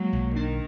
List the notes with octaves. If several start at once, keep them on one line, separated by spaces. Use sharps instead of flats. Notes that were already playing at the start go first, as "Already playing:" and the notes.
Already playing: F#3 G#3 A#3
B1
D#3 D4